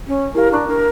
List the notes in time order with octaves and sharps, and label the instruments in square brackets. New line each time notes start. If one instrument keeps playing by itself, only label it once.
[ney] C#4
[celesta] E4 G4 F5 [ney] A#4
[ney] D4 [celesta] A#5 C#6 F#6
[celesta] D4 [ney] A#4